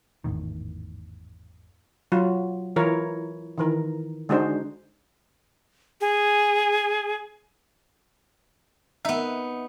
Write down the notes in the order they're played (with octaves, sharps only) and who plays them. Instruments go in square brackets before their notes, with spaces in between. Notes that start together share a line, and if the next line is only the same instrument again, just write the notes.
[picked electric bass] G#1 E2 A2 D#3
[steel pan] F#3 F4
E3 E4 F4 A#4 C#5
D#3 E3 A#4
D3 G#3 D4 D#4 F#4 C5
[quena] G#4
[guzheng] B3 D#4 [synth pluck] E5